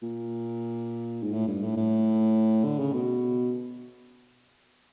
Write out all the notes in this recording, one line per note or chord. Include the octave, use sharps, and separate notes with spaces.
A#2
G#2
A2
G2
A2
A2
D3
C#3
B2